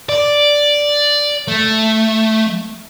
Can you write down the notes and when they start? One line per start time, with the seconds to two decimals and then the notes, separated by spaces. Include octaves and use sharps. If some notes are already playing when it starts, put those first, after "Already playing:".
0.09 D5
1.48 A3